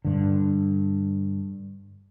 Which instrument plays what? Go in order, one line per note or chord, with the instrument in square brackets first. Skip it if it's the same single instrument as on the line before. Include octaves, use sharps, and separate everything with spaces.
[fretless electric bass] G2 D3